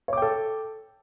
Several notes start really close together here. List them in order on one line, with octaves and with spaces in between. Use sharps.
C#5 D6 G5 A4